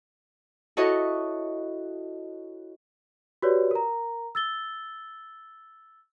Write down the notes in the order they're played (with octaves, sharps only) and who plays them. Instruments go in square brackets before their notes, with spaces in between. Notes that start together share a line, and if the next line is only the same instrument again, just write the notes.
[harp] E4 F#4 A4 C#5 D#5
[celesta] F#4 G4 B4 C#5 D5
A#4 A#5
E6 A6 G7